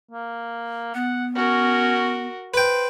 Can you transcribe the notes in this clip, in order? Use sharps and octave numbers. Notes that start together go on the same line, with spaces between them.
A#3
B3 F#5
C#4 F#4 A#4
B4 C5 G5